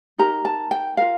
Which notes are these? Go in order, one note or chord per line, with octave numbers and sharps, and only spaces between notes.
D#4 G4 A#4 A#5
A5
G5
F4 A#4 F5